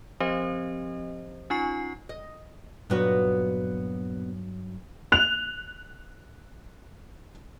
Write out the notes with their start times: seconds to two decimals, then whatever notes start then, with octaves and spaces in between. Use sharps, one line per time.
0.20 F3 C4 G4 C5 D#5
1.50 C#4 D#4 F4 G#5 C#6 C7
2.09 D#5
2.90 G2 A#2 F#3 B3 F#4
5.12 F#6 F7